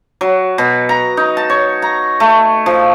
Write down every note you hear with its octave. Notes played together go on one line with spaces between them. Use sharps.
F#3
B2
A#5
D#4
A5
C#5
A#5
A3
F3